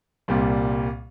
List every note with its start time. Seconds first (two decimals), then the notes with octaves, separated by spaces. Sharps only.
0.28 C2 A#2 G3